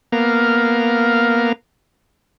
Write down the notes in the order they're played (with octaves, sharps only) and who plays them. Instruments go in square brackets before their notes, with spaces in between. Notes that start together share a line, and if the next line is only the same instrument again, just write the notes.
[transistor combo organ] A#3 B3 A#4 F5